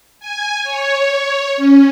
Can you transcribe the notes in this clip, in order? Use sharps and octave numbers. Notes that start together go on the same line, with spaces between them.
G#5
C#5
C#4